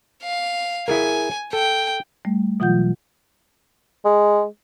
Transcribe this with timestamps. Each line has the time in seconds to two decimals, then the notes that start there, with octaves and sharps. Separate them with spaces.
0.23 F5
0.88 E4 G#4 A#4 G#5
1.53 A4 G5
2.25 G3 A3
2.60 B2 E3 F#3 F4 F#5 G6
4.05 G#3